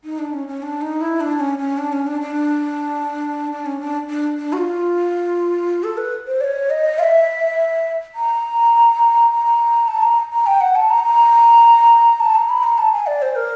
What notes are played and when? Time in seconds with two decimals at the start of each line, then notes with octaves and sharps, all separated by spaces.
0.04 D#4
0.19 D4
0.33 C#4
0.47 C#4
0.62 D4
0.81 D#4
1.01 E4
1.20 D4
1.40 C#4
1.58 C#4
1.78 D4
1.92 C#4
2.07 D4
2.21 D4
3.52 D4
3.66 C#4
3.81 D4
4.09 D4
4.38 D4
4.53 F#4
4.57 F4
5.84 A4
5.97 B4
6.27 C5
6.41 D5
6.44 C#5
6.70 D#5
6.99 F5
7.03 E5
8.15 A#5
9.31 A#5
9.88 A5
10.02 A#5
10.33 A#5
10.46 G5
10.61 F#5
10.76 A5
10.90 A#5
11.04 A#5
12.20 A5
12.35 A#5
12.49 B5
12.63 A#5
12.78 A5
12.93 G#5
13.07 D5
13.22 C5
13.36 A#4